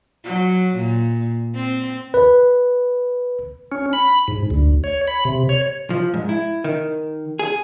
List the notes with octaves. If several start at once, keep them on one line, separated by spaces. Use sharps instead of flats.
F#3
A#2
C4
B4
C#4
B5
G#2
D2
C#5
B5
C3
C#5
F3
G#2
E4
D#3
G#4